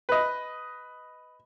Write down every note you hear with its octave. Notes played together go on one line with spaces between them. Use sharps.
B4 D#5